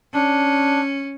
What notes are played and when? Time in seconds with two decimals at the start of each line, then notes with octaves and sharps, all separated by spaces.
0.14 C#4 D4